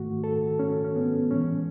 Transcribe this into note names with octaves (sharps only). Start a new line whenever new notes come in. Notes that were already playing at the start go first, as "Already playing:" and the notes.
Already playing: G#2 D#3 A3 F#4
A4
C#4
C#4
B3
A2 E3 G#3 C#4